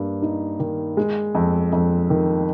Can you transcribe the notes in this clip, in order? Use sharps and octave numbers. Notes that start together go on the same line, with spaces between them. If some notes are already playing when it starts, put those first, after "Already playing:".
Already playing: G2 A#3
D#4
D#3
G#3
F2
F2
D#3